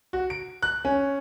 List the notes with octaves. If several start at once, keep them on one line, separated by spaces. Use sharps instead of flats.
F#4
D7
F#6
C#4